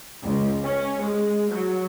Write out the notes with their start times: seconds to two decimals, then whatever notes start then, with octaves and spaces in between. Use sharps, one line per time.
0.24 C#2
0.64 C#4
1.01 G#3
1.50 F#3